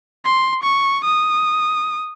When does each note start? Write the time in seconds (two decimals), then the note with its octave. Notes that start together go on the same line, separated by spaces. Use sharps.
0.25 C6
0.63 C#6
1.04 D#6